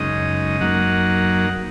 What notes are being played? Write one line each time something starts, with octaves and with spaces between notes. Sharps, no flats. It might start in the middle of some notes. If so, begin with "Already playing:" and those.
Already playing: F#2 C#3 G#3 D#4 D#5
F#2 F#3 A#3 D#4 F#5